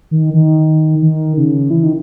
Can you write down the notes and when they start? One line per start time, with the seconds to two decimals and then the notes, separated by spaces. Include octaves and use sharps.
0.11 D#3
0.34 D#3
1.02 D#3
1.37 C#3
1.70 E3
1.83 D#3